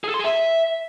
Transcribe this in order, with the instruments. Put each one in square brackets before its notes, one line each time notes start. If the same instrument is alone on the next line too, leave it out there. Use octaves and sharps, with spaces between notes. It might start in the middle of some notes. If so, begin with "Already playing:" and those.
[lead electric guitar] G#4
A4
C6
G#4
E5